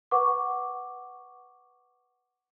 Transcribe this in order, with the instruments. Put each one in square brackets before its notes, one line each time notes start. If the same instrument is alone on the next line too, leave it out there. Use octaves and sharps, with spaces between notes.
[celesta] B4 F#5 C#6 D6